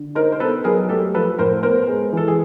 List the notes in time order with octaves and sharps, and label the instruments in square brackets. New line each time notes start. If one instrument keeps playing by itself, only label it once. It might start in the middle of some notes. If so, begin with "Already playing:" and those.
Already playing: [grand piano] D3
[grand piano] D#4 [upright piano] A#4 C5
[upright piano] C5
[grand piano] B3 [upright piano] A4 B4
[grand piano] F#3 [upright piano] G#4 A#4
[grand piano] A3 [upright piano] G4 A4
[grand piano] F3 [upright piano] A4 B4
[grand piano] A2 [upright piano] A#4 C5
[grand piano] B3 [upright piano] A#4 C5
[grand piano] G#3
[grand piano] E3 [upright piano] A4
[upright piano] G#4